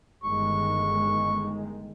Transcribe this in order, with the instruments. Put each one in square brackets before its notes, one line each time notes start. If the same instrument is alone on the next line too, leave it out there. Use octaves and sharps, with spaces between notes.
[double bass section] G1 D#3 G#3 [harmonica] C#6